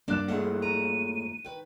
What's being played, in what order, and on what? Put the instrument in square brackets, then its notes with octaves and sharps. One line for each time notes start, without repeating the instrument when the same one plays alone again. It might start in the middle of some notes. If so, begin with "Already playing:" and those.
[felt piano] G2 F#6 E7 [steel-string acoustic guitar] A#3 D4 D5
[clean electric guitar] A#2 G#3 A3 [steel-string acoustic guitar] F#5
[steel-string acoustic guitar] D#3 A#5 [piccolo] D#7
[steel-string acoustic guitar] D#3 B4